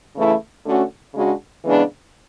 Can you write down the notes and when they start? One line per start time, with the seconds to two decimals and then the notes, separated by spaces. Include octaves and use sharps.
0.16 C#3 E3 A3 E4
0.66 D3 A3 C#4 F#4
1.15 C#3 G#3 D4 F#4
1.64 C#3 E3 G#3 B3 D4